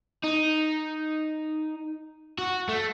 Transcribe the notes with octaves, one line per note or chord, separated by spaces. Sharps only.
D#4
F#4
A3